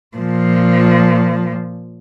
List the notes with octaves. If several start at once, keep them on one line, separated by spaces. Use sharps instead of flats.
A#2 F3